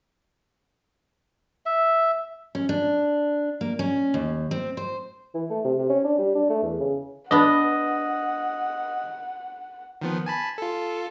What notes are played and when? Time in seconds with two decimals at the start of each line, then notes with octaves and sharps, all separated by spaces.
1.66 E5
2.55 C#4
2.69 D4
3.61 A#3
3.79 C#4
4.14 D#2
4.51 C4
4.77 C5
5.34 E3
5.50 A3
5.64 C3
5.78 C3
5.89 C#4
6.04 D4
6.18 G3
6.35 D4
6.49 A3
6.62 E2
6.80 C#3
7.31 B3 D4 D#5 F#5
10.01 D#3 F3 B3
10.26 G#5 A5 B5
10.58 F4 A4